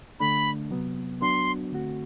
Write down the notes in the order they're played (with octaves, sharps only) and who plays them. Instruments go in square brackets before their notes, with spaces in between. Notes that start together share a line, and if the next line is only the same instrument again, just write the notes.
[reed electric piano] D3 A3 D4 [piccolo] B5
[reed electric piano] C3 F#3 B3
[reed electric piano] F#3 B3 D4 F#4 [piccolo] C6
[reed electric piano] D3 A3 C4 F#4